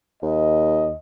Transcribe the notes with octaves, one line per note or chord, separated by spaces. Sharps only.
D#2 D#5